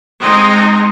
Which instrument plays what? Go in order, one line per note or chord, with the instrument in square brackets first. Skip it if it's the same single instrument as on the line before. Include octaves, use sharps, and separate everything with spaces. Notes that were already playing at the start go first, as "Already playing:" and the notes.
[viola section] G#3 C4 D#4 D#5 C6